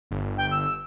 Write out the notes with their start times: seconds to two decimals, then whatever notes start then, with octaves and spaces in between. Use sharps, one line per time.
0.11 G1
0.38 G5
0.51 E6